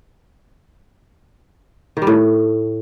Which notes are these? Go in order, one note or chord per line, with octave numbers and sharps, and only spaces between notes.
D#3
G3
A2